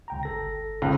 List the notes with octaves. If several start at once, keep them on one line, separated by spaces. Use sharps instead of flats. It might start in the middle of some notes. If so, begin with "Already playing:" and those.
C#2 G5 A#5
G1 A4 A#6
C#2